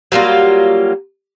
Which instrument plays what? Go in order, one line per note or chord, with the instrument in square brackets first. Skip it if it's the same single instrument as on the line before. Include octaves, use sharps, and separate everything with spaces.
[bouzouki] F#3 G3 A#3 F4